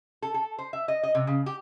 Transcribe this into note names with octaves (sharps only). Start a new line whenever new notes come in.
A4
A4
C5
E5
D#5
D#5
C3
C#3
G4